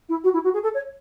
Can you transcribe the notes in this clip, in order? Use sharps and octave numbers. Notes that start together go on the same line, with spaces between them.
E4
F#4
E4
F#4
G#4
A4
C#5